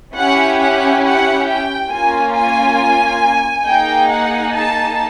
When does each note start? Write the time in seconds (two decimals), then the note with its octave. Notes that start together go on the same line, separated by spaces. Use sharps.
0.16 C#4 E4 G4 F#5
0.60 F#5
1.05 F#5
1.48 G5
1.91 A#3 C#4 F4 G#5
2.35 G#5
3.66 A#3 D#4 G#4 G5
4.10 F#5
4.54 A5